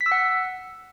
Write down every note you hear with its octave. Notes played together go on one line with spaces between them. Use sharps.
B6
E6
F#5